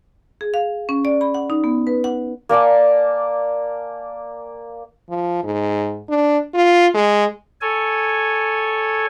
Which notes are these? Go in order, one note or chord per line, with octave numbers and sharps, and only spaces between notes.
G#4
F5
C#4
D5
B5
F#5
D#4
B3
B4
F#5
A#3 D5 G#5 A5
F3
G#2
D4
F4
G#3
A4 C#5 G#5